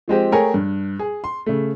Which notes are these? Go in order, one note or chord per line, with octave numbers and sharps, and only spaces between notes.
F3 G#3 C4 G4
A3 G#4 A#4 C#5 G5 G#5
G2
G#4
C6
C#3 A3